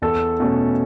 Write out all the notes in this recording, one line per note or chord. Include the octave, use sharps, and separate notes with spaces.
E2 A4
B2 A3 C#4